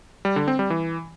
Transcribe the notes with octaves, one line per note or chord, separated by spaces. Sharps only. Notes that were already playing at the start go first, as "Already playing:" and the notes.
G3
D3
C4
G3
E3